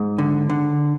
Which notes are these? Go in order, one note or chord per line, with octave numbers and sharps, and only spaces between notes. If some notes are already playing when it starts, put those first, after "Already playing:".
Already playing: G#2
D3
D3